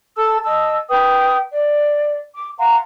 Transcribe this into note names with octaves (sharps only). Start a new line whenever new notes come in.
A4 A5 E6
D#5 A5 E6
B4 G5 D#6
D5
D6
F5 F#5 A#5 C6